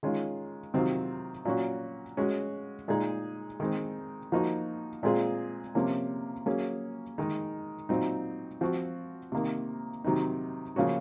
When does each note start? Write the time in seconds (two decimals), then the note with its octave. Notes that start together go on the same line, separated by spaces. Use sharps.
0.03 D#3 G#3 C#4 F4
0.74 C3 D#3 F#3 C4 F4
1.45 A#2 F#3 C#4 F#4
2.17 G#3 C#4 F#4
2.88 A#2 G#3 D#4 G#4
3.60 D#3 G#3 C4
4.32 F3 A#3 D#4 F#4
5.03 A#2 G#3 C4 F4 G#4
5.75 C3 F3 A#3 C#4
6.46 F#3 A#3 C#4 G#4
7.18 D#3 G#3 D#4
7.89 A#2 F#3 C4 D#4
8.61 F3 C4 F#4
9.32 C3 D#3 A#3
10.04 C3 D#3 F#3 C4 D#4
10.76 C#3 F3 A#3 C#4 F#4